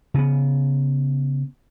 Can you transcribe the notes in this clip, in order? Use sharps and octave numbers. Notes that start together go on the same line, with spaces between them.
C#3 B3